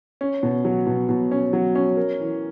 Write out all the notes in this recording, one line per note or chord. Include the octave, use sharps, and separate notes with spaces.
C#4
B2
F#3
B2
B2
C#4
F#3
C#4
A#4
E3